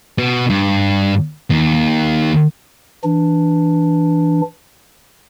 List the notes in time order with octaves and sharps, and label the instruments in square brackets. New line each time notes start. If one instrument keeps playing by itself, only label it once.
[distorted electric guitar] B2
G2
D#2
[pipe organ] E3 D4